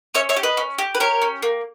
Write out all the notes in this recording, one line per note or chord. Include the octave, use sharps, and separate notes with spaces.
C#4 C#5 E5
C#5 E5
G4
B4 D#5
C#4
G4
B4
G4 A#4 C#5
C#4
A#3